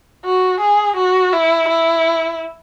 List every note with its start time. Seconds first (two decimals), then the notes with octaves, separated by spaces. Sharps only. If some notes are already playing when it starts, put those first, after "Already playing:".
0.25 F#4
0.61 G#4
0.97 F#4
1.33 E4
1.68 E4